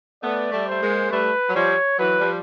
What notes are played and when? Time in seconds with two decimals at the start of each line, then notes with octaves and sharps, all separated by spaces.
0.23 A3 B3 D5
0.52 G3 A3
0.67 A3 C5
0.82 G#3 A#3
1.11 G3 A3 B4
1.49 F#3
1.55 F3 G3 C#5
1.99 E3 F#3 B4
2.20 F3 G3